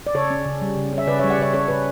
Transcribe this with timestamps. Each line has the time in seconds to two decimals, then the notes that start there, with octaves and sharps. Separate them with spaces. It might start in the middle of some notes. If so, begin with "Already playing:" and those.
0.07 D5
0.15 C#3 A4 C#5
0.31 C#4
0.45 C#3
0.62 G3
0.77 C#3
0.93 C#4
0.98 E5
1.07 C#3 B4 D5
1.19 G3 C#5 E5
1.30 D5 F#5
1.38 C#3 C#5 E5
1.54 C#4 A4 C#5
1.68 C#3 B4